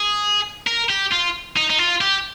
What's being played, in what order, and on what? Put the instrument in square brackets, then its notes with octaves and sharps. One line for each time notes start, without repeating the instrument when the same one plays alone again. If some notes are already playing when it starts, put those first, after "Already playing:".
Already playing: [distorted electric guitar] G#4
A#4
G4
F4
D#4
D#4
F4
G4